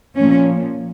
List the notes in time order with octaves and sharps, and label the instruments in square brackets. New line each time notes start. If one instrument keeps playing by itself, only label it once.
[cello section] A#2 F3 C#4